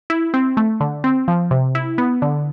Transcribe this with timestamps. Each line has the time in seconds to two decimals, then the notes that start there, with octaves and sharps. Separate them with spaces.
0.10 E4
0.34 C4
0.57 A3
0.80 D3
1.04 C4
1.28 F3
1.51 C3
1.75 E4
1.98 B3
2.22 D3